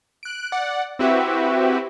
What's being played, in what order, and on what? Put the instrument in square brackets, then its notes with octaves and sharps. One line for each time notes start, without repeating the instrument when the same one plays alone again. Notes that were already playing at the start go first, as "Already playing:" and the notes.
[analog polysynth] F#6 D7
D5 F#5
C4 E4 F#4 G4 B4 E5